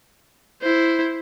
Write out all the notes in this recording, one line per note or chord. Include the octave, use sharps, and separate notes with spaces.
E4 C5